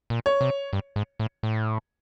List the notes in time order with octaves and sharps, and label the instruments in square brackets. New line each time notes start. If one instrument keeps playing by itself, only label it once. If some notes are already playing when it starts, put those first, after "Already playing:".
[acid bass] A#2
[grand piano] C#5
[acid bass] C3
G2
G#2
A2
A2